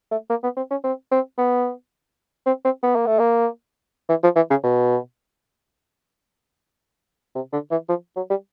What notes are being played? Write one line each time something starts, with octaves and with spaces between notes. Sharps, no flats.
A3
A#3
B3
C4
C#4
C4
C4
B3
C4
C4
B3
A#3
A3
A#3
E3
F3
E3
C#3
B2
C3
D3
E3
F3
F#3
G3